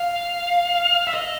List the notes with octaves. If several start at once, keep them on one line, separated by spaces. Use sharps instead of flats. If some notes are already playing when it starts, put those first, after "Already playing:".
Already playing: F5
E5
D#5